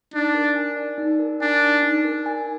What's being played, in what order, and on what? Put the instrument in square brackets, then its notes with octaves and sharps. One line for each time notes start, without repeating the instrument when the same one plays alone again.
[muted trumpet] D4 [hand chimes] D#4
[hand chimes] A#4
G#5
D5
D#4
A#4
[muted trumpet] D4 [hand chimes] G#5
[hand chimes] D5
D#4
A#4
G#5